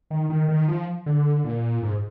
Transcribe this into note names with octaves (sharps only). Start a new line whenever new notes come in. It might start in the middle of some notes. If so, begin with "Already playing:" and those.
D#3
D#3
D#3
F3
D3
A#2
G#2